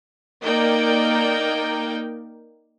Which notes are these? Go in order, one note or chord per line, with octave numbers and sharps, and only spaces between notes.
A#3 D#4 A#4 D5 G5